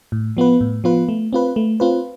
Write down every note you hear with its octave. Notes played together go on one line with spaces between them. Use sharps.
A2
F3 B3 F4 B4
A2
F3 B3 F4 B4
A3
C4 F4 B4
A3
C4 F4 B4